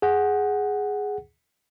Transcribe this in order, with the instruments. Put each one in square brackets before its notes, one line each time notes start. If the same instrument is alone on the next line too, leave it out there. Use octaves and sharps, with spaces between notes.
[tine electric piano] G#4 F#5